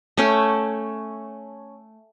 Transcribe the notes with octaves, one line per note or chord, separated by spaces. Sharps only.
A3 C#4 G5